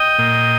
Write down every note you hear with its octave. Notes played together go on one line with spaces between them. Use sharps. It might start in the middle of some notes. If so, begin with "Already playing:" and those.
Already playing: D#5 G5
A#2